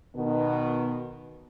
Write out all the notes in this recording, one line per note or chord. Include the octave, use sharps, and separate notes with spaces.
B2 D#3 B3